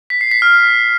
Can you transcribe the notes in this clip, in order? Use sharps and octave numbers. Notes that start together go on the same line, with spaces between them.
B6
C7
B6
F6